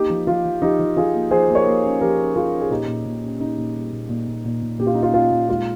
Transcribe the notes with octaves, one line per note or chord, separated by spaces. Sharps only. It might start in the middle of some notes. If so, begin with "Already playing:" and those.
Already playing: A#3 D#4 G4
F3
F3 F4
F3
F3 D#4 G4
F3
F3 F4 G#4
A#3
F3 G#4 C5
A#3
A#4 C#5
A#3
C#4
F3 G4 A#4
C#4
C#4 F4 G#4
C#4
G#4
A#2 D#4 G4
A#2
A#2
C#4
C#4 D#4
A#2
G3
A#2
A#2
A#2
A#2
A#2
A#2 G4
F4
C#4 D#4
F4
C#4 F4
A#2
G#3 F4